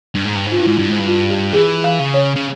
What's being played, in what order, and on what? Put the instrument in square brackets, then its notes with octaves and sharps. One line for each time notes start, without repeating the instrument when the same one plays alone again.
[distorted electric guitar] G2
G#2
G2
G#2
[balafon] F4
[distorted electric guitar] G2 [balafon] E4
[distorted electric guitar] G#2
G2
G#2
G2
[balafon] F4
G4
[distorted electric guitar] E3 [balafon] G#4
[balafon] F5
[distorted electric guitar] C#3
[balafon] C#5
[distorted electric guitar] C#3